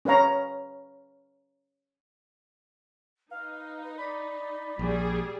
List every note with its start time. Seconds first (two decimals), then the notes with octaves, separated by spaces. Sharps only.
0.05 C#4 B4 C#5 F5 A#5
3.31 D#4 B4 F5
3.98 D5 B5
4.79 A#1 G3 G#4